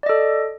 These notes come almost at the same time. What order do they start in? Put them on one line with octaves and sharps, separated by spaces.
D5 D#5 A4